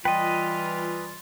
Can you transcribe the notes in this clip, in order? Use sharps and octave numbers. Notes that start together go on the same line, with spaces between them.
E3 G3 F4 B4 D#5 G5